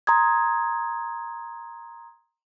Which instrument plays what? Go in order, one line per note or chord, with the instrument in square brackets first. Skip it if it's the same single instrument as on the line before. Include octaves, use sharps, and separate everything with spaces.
[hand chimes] A#5 C6 D#6 G#6